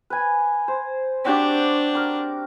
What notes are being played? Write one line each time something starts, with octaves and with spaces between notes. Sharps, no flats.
B4 G#5
C5
C4 D4 F#4 G4
A#4 D6